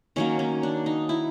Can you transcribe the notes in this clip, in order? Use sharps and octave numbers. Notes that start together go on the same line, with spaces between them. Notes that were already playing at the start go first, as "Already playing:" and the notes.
D#3 F#3 A#3 C#4
C#4
D4
D#4
E4